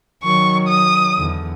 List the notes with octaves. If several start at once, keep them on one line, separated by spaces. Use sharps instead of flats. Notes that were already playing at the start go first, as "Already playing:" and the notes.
D#3 F#3 C#6
D#6
E2 D3